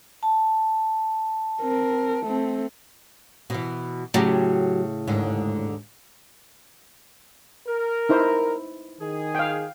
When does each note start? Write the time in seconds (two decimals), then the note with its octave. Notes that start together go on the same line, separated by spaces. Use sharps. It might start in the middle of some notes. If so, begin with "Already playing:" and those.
0.23 A5
1.61 C4 A#4
2.25 A3 C4
3.50 B2 E3
4.14 A2 C#3 F#3 F#4 G4
5.07 D#2 G#2 D3
7.67 A#4
8.09 D#4 E4 C5
9.00 D#3 G#4
9.35 F5 G5